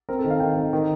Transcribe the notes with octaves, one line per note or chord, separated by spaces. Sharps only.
C4 A#4
A4
D#3
F5
D#3 G5
D#3
D#3